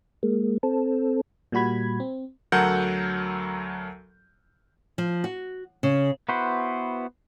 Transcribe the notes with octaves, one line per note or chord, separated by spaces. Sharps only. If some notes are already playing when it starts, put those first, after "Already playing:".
G#3 A#3
C4 A4
A#2 G3 F#4 B5 G#6
C4
D2 F#3 A4 A#4 F#5 G6
F3
F#4
C#3
B3 E4 F#4 B4 C5